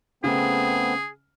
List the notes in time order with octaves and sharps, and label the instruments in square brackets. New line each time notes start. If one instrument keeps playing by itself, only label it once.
[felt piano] C#3 [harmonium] A3 B3 C4 [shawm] G#4